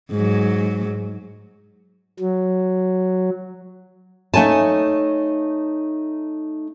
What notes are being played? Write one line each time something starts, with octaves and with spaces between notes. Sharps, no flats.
G#2 F#3
F#3
A3 D#4 C#5 G#5 A5